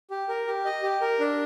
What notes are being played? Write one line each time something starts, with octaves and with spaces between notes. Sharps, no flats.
G4
A#4
G4
D#5
G4
A#4
D4